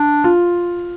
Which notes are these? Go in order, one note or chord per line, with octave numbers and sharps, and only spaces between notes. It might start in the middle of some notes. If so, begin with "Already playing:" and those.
Already playing: D4
F4